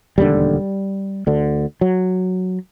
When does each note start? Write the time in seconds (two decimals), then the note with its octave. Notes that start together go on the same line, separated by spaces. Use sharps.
0.18 E1 D#2 D3 G3
1.27 D2 D3
1.81 F#3